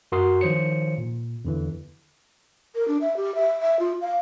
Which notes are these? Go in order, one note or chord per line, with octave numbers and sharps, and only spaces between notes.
F#2 F#4 A#4 C6 D#6 C7
D#3 F3 C5 C#5 C#7
A#2
E2 D3 E3
A#4
D4
E5
G4
E5
E5
F4
F5